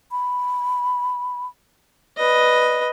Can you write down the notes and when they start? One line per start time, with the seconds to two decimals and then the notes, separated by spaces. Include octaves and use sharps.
0.11 B5
2.17 B4 D5 D#5